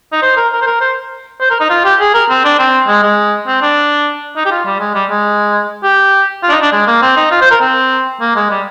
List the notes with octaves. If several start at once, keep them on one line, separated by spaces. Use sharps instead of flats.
D#4
C5
A#4
A#4
C5
A#4
C5
C5
A#4
D#4
F4
G4
G#4
A#4
C4
D4
C4
G#3
G#3
C4
D4
D#4
G4
F4
G3
G#3
G3
G#3
G4
F4
D4
D#4
D4
G#3
A#3
C4
D#4
F4
C5
A#4
C4
A#3
G#3
G3